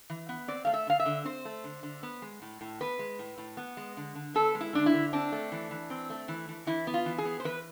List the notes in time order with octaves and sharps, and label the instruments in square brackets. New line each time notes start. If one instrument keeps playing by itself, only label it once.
[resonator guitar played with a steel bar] E3
B3
C4 D5
A3 F5
E5
D3 F5
E5
D3
C4 C5
A3
D3
D3
B3
G#3
A2
A2
B3 B4
G#3
A2
A2
B3
G#3
D3
D3
B3 A4
G#3
E4
D3 D4
E4
D3
C4 D4
A3
E3
E3
C4
A3
E3
E3
E3 E4
B3
F4
E3
G#4
B3
C5
E3 B4